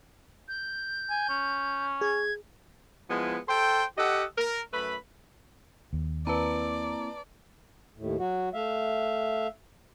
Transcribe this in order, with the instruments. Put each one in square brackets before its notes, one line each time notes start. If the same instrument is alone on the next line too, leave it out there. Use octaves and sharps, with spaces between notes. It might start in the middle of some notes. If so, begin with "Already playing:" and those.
[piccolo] G6
[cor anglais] G#5
C#4
[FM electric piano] G#4 [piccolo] G#6
[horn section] F3 G#3 B3 E4
A4 C5 G5
G4 A4 D#5 F#5
A#4
F#2 A3 B4 B5
[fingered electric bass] D#2
[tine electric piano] A#3 C4 E4 [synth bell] B4 A5 A#5 [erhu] D5
[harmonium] D#2 A2
F#3 F#4
A3 E5 F5